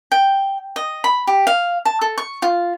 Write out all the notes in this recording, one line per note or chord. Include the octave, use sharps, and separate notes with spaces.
G5
D#5
B5
G4
F5
A5
A4
C#6
F4